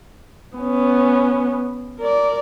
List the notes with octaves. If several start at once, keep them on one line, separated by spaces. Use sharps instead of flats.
B3 C#4
A#4 D5